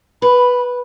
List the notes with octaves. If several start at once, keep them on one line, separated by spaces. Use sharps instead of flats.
B4 B5